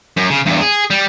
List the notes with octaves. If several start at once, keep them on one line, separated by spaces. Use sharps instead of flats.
F#2
C#3
E2 G2
G#4
G3